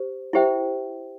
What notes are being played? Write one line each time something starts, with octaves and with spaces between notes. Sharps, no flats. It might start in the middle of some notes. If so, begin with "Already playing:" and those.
Already playing: G4 C5
E4 G4 C5 E5 G5